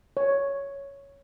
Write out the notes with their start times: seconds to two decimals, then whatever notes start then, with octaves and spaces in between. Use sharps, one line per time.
0.17 C#5